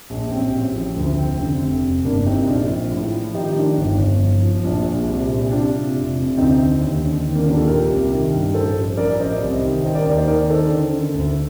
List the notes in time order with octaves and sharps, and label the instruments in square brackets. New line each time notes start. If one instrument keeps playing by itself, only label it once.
[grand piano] A#1
A1 C4
A1
F3
D2
F1 C4
D3
F1
F1
G1 A#3 D4
C3 C4 D#4
A#1 D4 F4
F3
A2
F3
D#3 D#4 G4
D#3 D4 F4
G1
G1
F3
F3
A#1 D4 F4
A#1
C2
A#2
G4
C3 D4 F4
C3
F1
F1
D2 C4 D#4
D3
D#2
D3
D#3
A#3 D4
D#2 D4 F4
F4 A4
A#2 G4 A#4
C2
D#3
G2
A1 A4 C5
F3
A1 A#4 D5
A1 C5 D#5
C2
D#3
D#3 C5 D#5
A#4 D5
D#2 A#4 D5
C5 D#5
D#3 A#4 D5
D#3 A4 C5
D3
D3
D2